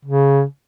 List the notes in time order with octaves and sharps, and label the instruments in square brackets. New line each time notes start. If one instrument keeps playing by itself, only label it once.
[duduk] C#3